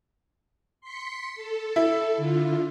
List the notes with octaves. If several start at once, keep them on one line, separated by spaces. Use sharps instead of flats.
C6 B6 C#7
A4
E4
D3 F4